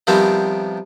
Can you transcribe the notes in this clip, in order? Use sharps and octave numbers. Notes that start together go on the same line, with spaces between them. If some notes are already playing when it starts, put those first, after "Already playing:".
C3 D#3 F3 G3 B3 C4